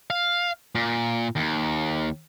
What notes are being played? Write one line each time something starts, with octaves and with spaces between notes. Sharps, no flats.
F5
A#2
D#2